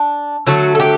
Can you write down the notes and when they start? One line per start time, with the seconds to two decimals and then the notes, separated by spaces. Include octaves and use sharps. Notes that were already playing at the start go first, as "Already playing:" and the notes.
Already playing: D4
0.47 D3 F#3 A3 F#4
0.75 A4
0.80 G4